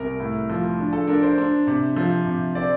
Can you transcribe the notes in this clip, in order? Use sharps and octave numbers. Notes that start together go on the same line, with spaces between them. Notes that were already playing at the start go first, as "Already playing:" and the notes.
Already playing: C2 A#4
A2
F3
D4
A4
D4 A#4
C5
D4
C3
F3
C3
C4 D5